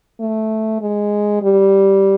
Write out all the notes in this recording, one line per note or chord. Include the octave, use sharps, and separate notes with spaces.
A3
G#3
G3